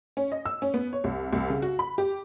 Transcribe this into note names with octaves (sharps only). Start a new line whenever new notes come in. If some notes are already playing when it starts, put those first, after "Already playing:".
C#4
D#5
E6
C#4
B3
C#5
C2
C2
C#3
F#4
B5
G4